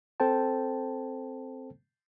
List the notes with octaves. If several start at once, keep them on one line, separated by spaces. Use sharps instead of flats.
C4 A4 C5 G5 A5